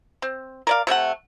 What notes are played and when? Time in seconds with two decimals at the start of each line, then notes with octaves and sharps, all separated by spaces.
0.22 C4
0.67 A#4 D5 F5
0.87 C3 A3 E5 F#5